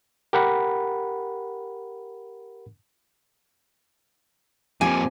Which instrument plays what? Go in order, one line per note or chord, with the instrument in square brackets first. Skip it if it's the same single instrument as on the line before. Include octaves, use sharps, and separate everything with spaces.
[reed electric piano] G4 A#4 F#5 B5
[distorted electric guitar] F2 A#2 [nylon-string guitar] F3 G4 [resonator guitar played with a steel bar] G#5